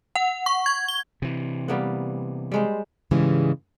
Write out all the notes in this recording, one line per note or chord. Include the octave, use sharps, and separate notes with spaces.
F#5
C#6
G#6
G7
C3 E3
G3 A#3 B3
G3 G#3 C5
G#2 C#3 E3 G3 G#3